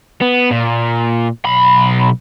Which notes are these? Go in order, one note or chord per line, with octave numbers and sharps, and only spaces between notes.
B3
A#2
B1 B5